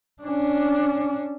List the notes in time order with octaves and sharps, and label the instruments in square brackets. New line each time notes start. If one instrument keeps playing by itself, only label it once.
[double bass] C#4 D4